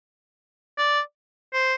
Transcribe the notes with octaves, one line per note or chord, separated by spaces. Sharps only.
D5
C5